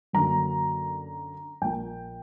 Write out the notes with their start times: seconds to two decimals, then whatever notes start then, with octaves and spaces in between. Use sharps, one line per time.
0.13 F#2 D3 F#3 A#3 A#5
1.62 A#1 A#2 A#3 G5